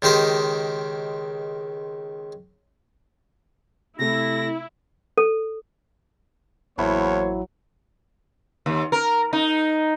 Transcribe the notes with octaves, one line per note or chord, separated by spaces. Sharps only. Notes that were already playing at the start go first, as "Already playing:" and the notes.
C#2 D#3 G4 C5 D#5
C3 A3 E4 A#6
A4
A1 E2 F#3 A#3 E4 C5 C#5
D#2
A#4
D#4